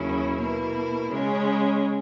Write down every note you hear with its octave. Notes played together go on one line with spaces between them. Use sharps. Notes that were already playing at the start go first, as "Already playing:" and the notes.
Already playing: D#2 C#3 F#3 C#4 E4
B2 A#3 E4
C#3 G#3 C#4